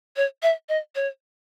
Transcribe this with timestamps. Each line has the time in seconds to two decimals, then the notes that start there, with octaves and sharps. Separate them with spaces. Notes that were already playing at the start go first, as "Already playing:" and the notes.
0.16 C#5
0.43 E5
0.69 D#5
0.95 C#5